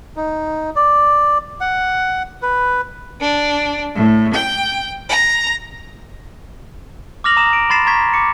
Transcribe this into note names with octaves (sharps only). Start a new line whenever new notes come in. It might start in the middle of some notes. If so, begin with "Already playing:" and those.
D#4
D5
F#5
B4
D4
A2
G5
A#5
D6 D#6 F6 A#6 F7 F#7
A#5 D#6 E7
D7
B5 C6 A6 C7 E7
A#5 C#6 G#6 B6
D6 C#7